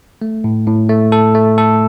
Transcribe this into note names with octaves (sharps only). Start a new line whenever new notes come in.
A3
A2
A2
A3
A4
A3
A4